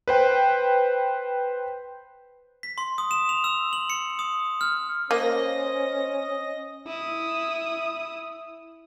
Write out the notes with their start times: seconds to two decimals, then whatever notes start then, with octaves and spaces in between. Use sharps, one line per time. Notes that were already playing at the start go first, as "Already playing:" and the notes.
0.08 B4 C5 G5
2.63 B6
2.78 C6
2.98 D#6
3.11 E7
3.29 F7
3.44 E6
3.73 F#7
3.90 C#7
4.19 D#6
4.61 F6
5.11 A#3 C#4 C5 D#5 A#6
6.87 E4 D#6